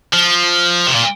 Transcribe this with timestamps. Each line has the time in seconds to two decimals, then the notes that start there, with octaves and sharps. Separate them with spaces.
0.13 F3
0.87 C3
0.95 A#2